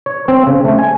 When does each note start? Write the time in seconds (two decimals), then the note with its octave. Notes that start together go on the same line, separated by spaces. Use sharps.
0.06 C#5
0.28 C4
0.47 C#3
0.65 A3
0.79 G#5